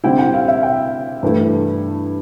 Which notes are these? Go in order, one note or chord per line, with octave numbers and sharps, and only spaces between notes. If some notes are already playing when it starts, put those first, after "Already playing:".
D3 G3 C4 E4 G5
G5
F5
E5
G5
G2 E3 A3 E4